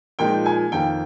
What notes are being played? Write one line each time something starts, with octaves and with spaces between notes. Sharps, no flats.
A#2 F3 G#3 D#4 G5
G#5
F2 D#3 A#3 G5